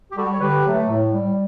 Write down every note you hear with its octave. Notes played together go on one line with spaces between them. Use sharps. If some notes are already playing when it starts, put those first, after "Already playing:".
G4
G3 F#4 A4
C#5
D3 G4 B4
F#3 A3
A2
G3